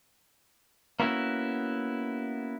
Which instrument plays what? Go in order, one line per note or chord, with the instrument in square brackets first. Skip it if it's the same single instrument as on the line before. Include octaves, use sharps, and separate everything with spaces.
[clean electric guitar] A#3 B3 C#4 E4 F#4